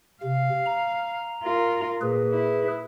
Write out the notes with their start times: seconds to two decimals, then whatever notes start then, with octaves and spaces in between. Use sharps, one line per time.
0.23 C3 F5
0.66 A#5
1.44 F4 A#4
2.01 A#2 G#4 B4
2.31 E4